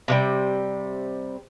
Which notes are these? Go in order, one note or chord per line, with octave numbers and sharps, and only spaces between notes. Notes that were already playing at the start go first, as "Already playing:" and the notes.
C3 E3 G3